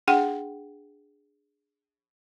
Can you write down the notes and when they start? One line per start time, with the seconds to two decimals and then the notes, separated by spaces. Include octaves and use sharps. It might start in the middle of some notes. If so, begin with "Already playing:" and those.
0.08 D4 G#4 F#5 G5